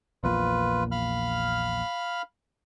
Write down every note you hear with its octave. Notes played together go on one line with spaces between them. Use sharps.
A#1 E2 A#2 F4 B4
F5 B5 F6